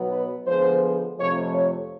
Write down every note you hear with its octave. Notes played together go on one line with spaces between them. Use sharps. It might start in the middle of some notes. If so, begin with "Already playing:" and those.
Already playing: B2 F#3 B3 D#4
B4
D3 F3 G#3 B3 C5
F2 C3 F3 A3 C#5
C#5